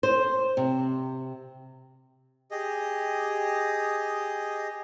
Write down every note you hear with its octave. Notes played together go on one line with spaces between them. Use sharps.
C5
C3
G4 G#4 D#5